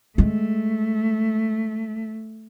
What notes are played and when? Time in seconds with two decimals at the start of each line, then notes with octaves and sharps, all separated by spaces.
0.18 G#3 A3